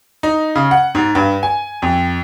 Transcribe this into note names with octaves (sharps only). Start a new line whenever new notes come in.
D#4
C#3
F#5
G#2
G2
G#5
F2